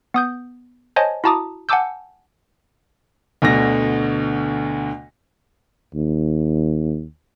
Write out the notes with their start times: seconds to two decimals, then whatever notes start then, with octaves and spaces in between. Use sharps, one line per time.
0.14 B3 D#6 G6
0.96 C5 C#5 D#5 G#5 A5
1.24 E4 F#4 A5 A#5 D6 D#6
1.69 F#5 G#5 A5 D6 E6 G6
3.42 D2 B2 D3 A#6
5.95 D#2